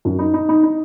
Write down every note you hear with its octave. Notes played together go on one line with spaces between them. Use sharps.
F#2
D#4
D#4
D#4
D#4